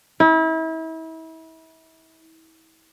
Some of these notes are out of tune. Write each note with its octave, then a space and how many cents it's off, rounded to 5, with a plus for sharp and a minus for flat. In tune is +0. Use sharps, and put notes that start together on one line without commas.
E4 -35